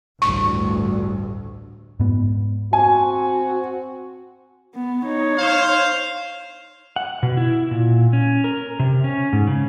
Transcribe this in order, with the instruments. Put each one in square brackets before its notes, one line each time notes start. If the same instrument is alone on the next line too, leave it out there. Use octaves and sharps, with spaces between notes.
[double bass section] A1 D2 G2 [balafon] C#6
[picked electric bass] G#2 B3
[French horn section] C4 F#4 [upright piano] G#5
[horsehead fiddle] B3
D#4 C#5
[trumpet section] C5 F5
[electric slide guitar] F#5
B2
E4
A#2
C#4
A#4
C3
C#4
G#2
C#3